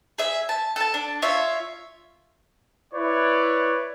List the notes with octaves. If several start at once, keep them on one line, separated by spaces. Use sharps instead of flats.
G#4 E5
A5
A4 A5
D4
F4 C#5 E5
E4 B4 C#5 D5